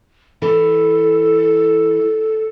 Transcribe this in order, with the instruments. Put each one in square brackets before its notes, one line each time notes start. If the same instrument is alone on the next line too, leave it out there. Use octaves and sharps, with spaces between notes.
[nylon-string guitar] E3 [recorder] A4